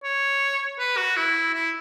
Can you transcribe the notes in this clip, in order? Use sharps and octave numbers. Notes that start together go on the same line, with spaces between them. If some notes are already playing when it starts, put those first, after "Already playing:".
C#5
B4
F#4
E4
E4